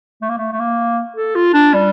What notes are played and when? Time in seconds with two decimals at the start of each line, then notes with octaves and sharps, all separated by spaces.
0.22 A3
0.29 A#3
0.37 A3
0.52 A3
0.59 A#3
1.16 A4
1.35 F4
1.54 D4
1.74 G3